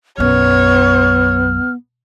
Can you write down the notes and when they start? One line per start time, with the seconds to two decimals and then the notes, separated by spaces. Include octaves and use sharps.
0.18 B1 F#2 B3 C#5 F6